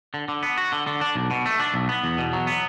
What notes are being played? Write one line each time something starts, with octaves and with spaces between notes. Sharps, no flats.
D3
D3
B3
F#4
D3
D3
D4
B1
B2
A3
D4
B1
B3
E2
B2
F#3
B3